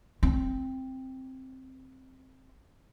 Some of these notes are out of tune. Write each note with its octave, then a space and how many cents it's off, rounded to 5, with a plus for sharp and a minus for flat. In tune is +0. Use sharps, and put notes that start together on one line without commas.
C4 +5 F4 -40